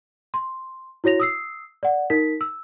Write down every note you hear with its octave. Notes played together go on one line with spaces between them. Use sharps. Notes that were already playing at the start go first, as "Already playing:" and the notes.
C6
E4 F#4 C#5 A#6 F7
D#6 E6 C7
D5 F#5
D#4 A#4 B6
E6